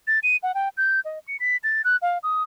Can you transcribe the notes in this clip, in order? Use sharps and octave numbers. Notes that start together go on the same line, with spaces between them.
A6
D#7
F#5
G5
G6
D#5
C#7
B6
A6
F#6
F5
D#6